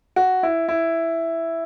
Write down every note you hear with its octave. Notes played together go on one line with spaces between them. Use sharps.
F#4
E4
E4